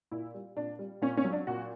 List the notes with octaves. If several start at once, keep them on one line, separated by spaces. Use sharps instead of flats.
A#2 E4
G3
A#2 D4
G3
A#2 C#4
C#4
F#3
D4
A#2 F#4